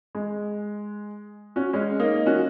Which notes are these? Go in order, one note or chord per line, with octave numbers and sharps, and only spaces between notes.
G#3
C#4 F#4
G#3 C#4
A#3 D#4
C#4 F#4